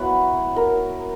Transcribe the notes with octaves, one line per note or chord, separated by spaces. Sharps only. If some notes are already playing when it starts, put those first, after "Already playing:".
Already playing: F#3 B3 E4 B4
A#4